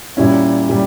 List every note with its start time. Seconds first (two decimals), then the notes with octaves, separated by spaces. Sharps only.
0.17 A#2 G3 C#4 E4
0.69 A#2 G3